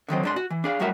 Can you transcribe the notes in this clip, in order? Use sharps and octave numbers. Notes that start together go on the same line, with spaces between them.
D3 D#3 F#3 C4
G#2 D4 C6
F#4
E3
D4 G#4 F5
F#2 A2 G3 F#4 A#4 E5